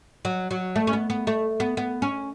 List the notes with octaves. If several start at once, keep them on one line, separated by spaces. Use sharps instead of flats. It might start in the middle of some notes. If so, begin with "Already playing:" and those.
F#3
F#3
A3
C#4
B3
B3
A3
B3
B3
C#4